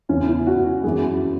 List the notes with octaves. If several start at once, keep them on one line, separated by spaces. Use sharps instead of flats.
E2 C#3 E3 C#4
E4
F#4
F#2 E3 G#4